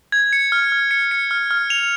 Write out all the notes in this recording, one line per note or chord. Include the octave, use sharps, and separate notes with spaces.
G#6
C#7
F6
F6
C#7
C#7
F6
F6
F7